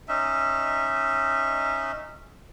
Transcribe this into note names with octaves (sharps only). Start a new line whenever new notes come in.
C#4 D#4 E5